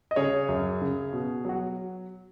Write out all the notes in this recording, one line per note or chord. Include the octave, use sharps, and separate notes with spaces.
D#5
C#3 G#4 C#5
F#2
C#3
B2
F#3 F#4